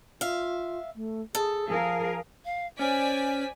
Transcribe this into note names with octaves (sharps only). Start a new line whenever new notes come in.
F4 E5 F5
A3
G#4 A4
F3 G#4 A#4 F5
F5
C#4 C5 D5 G#5 B6